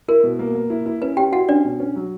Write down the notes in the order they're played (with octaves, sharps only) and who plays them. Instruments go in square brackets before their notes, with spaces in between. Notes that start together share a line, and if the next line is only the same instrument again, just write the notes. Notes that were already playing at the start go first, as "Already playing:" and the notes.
[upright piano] E4 [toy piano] A#4
[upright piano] B2
A#3
A#3
E4
E4
[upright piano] C#4 [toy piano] B4
[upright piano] C#4 [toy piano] G4 G5
[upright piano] E4 [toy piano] F#4 F#5
[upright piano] C#4 [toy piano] D4 D5
[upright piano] B2
C#4
F#3